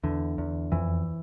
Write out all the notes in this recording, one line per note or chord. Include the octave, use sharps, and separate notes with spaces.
E2 D3
E2
F2 E3